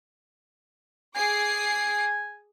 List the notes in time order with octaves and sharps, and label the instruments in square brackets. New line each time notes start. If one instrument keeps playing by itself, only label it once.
[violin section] G#4 D6 C7 [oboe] G#5